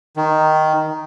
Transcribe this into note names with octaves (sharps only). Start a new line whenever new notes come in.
D#3